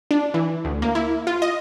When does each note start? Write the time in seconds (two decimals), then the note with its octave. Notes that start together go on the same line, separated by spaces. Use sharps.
0.11 D4
0.34 E3
0.65 D2
0.82 A#3
0.95 E4
1.27 F4
1.42 D#5